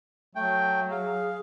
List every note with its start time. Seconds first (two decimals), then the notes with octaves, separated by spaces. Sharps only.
0.35 F#3 A3 G5
0.91 G#4 F5